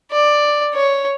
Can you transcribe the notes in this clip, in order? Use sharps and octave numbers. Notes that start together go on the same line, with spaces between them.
D5
C#5